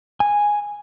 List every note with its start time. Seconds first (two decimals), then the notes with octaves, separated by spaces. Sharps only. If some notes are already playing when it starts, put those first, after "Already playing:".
0.20 G#5